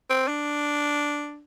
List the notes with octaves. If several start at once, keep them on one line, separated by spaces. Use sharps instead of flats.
C4
D4